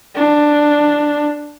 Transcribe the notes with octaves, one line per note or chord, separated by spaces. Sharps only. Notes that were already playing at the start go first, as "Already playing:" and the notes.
D4